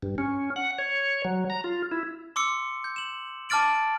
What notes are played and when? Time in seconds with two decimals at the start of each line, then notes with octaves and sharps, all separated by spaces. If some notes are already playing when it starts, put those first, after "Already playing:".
0.02 G2
0.18 C#4
0.56 F#5
0.78 C#5
1.25 F#3
1.50 A#5
1.64 F4
1.91 E4
2.36 C6 D6 E6 C#7
2.84 G6
2.96 E7 F#7
3.49 A5 D6 F6 A6 D7 F#7